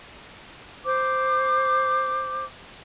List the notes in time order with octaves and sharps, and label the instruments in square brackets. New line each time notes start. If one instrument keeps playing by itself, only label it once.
[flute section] C5 D6